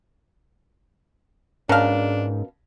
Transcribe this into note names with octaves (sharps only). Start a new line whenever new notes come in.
G#2 B2 C#4 D4 A#4 F5